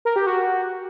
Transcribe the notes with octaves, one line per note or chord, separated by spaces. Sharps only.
A#4
G4
F#4